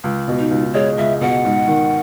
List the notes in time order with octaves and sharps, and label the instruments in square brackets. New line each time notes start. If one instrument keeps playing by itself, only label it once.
[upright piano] C#2
B2
[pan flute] D#4
[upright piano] C#2
[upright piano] G#3 [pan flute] C#5
[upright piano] C#2 [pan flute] E5
[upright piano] B2 [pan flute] F#5
[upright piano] G#2
D#3